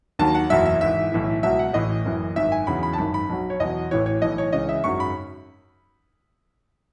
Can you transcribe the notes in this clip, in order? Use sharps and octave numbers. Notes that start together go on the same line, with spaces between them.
D#2 D#3 F#3 A5
F#5
F#1 E2 B2 F#3 E5
E5
G#1 G#2 E3 E5
B1 A2 E3
C#2 B2 F#3 E5
F#5
A1 A2 E3 D#5
F#1 F#2 E3
G#1 F#2 D#3 E5
G#5
E2 C#3 F#3 B5
B5
A5
G#1 F#2 D#3 B5
B5
B1 B2 F#3
C#5
E2 B2 F#3 D#5
A1 A2 E3 C#5
C#5
B1 A2 E3 D#5
C#5
C#2 C#3 E3 D#5
E5
G#1 F#2 C#3 F#3 C#6
B5